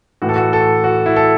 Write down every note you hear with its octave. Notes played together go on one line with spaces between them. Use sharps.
A2 E3 F#4
A4
F#4
A4
F#4
E4
A4